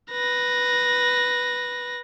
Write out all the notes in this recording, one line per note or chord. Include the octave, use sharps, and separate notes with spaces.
B4 A#6